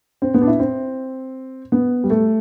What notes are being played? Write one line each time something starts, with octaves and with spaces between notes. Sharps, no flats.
C4
B3
D4
E4
C4
B3
G3
A3